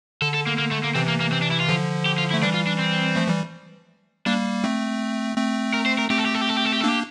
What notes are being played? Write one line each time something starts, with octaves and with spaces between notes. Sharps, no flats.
D3 A4
A4
A#3
A#3
A3
A#3
C3 E3 C4
A#3
A#3
C4
D4
E4
F4
D3 F3
G4
F4
E4
A3
E3 G3 D4
F4
D4
C4
F3 A3
E3 G3
G3 A#3 D4
A3 C4
A3 C4
A#4
C5
A#4
A3 C4 G4
A4
G4
A4
G4
A4
G4
A4
G4
A4
A#3 D4 G4